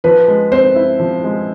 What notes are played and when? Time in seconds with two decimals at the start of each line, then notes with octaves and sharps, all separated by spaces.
0.04 F3 B4
0.28 G#3
0.52 C4 C5
0.75 E4
1.00 F3
1.24 G#3